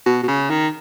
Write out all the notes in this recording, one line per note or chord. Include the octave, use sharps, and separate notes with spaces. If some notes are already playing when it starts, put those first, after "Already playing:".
B2
B2
C#3
D#3